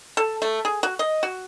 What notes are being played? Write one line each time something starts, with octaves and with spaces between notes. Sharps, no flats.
A4
A3
G#4
F#4
D#5
F#4